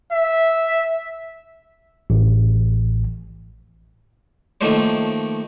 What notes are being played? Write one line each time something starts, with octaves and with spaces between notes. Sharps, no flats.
E5
A1
D#3 F3 A3 A#3 C5 C#5